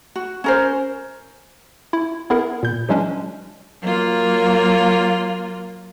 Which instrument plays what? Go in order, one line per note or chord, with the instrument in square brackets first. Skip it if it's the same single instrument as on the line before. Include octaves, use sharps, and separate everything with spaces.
[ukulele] F#4
C#4 A#4 C5
[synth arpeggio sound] E4
B3 E4 G#4 A#4
A#2 G6
E3 F#3 G#3 C#4 D4
[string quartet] F#3 A#3 F4